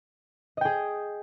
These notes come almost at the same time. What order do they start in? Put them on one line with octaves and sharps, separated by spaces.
D#5 G5 G#4